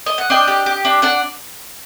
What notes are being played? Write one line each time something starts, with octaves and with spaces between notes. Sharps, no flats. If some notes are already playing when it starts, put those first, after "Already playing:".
D#5
F#5
D4 D#5 G5
G4
G4
D4
D4 D5 F#5